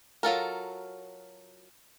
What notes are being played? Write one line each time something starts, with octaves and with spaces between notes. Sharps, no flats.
F#3 F4 A4 A#4